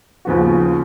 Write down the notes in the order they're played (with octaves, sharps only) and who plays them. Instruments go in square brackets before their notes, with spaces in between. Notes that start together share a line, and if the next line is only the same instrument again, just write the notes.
[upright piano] D#2 C#3 F3 B3 F#4